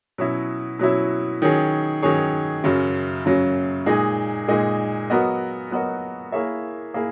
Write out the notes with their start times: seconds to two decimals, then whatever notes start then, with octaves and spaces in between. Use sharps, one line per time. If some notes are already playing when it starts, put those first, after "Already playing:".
0.18 B2 F#3 C#4 E4
0.79 B2 F#3 C#4 E4
1.42 D#3 F#3 C#4 G#4 C#5
2.03 D#3 F#3 C#4 G#4 C#5
2.64 F#2 C#3 F#3
3.25 F#2 C#3 F#3
3.86 A#2 G#3 D#4 G#4 D#5
4.48 A#2 G#3 D#4 G#4 D#5
5.10 F#3 B3 F#4 A#4 D#5
5.71 F#3 B3 F#4 A#4 D#5
6.32 A#3 E4 G#4 C#5 E5
6.94 A#3 E4 G#4